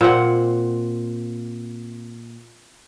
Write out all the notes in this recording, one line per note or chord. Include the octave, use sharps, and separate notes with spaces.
A#2 C4 F#5